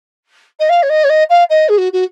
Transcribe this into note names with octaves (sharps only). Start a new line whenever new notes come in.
D#5
F5
C#5
D#5
C#5
D#5
F5
D#5
G#4
F#4
F#4